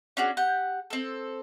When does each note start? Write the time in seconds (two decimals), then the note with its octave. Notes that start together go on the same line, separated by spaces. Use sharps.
0.17 C#4 D4 F#4 G#4
0.37 G4 F#5
0.90 C4 A4